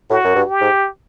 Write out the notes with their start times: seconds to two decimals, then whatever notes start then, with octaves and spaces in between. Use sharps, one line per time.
0.10 A2 F#4
0.24 F#2
0.35 G2
0.48 G4
0.61 G#2